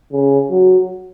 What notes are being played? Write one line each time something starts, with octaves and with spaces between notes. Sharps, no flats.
C#3
F#3